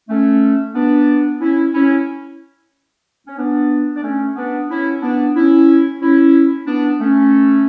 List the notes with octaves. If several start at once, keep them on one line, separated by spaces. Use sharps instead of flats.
A3 C#4
B3 D4
C#4 E4
C#4 E4
C#4
B3 D4
D4
A3 C#4
B3 D4
C#4 E4
B3 D4
C#4 E4
C#4 E4
B3 D4
A3 C#4